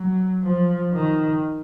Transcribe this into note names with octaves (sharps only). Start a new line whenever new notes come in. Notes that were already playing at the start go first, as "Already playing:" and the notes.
Already playing: F#3
F3
D#3